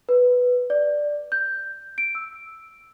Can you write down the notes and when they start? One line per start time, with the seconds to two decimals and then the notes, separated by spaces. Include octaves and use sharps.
0.09 B4
0.70 D5
1.32 G6
1.98 D7
2.15 E6